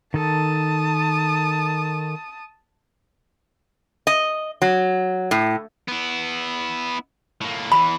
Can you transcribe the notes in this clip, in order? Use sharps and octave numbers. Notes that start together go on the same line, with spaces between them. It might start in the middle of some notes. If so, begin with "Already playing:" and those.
D#3 A4 A5 D#6
D#5
F#3
A2
B3 E4
A2 A#3
E2 E3 B5